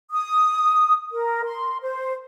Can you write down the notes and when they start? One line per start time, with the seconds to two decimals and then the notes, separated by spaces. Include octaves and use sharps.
0.11 D#6
1.12 A#4
1.45 C6
1.81 C5